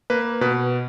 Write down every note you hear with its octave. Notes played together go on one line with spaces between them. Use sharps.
A#3 B4
B2 B4